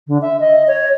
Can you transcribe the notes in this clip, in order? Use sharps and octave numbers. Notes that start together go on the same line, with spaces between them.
D3
E5
D#5
C#5